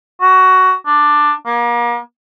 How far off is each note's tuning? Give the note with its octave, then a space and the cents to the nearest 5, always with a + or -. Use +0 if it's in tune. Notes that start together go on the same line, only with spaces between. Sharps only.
F#4 +15
D4 +10
A#3 +35